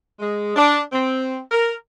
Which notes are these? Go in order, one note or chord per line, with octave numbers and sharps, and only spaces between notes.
G#3
D4
C4
A#4